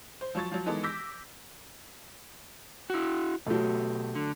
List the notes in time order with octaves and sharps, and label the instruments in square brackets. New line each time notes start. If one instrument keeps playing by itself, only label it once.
[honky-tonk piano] C5
F3 F#3 C#6 A6
F3 F#3
D#3 E3 G#3 B3 A4
D6 E6 G6 A#6 B6
[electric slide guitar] E4 F#4
[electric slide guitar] B2 G4 [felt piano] F#3 A3
[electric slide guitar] D3